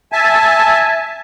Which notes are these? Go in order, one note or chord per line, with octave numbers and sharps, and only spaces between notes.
E5 G#5 A5